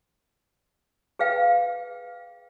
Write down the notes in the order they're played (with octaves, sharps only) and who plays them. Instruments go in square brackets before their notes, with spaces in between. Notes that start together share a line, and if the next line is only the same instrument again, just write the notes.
[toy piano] G#4 B4 F5 G5